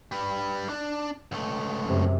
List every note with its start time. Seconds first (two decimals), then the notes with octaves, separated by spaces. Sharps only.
0.12 G3 B4
0.69 D4
1.32 C#2 A3
1.84 F#2 C3